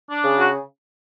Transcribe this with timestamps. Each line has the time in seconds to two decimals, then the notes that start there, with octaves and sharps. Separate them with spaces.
0.09 D4
0.23 C#3
0.38 F#4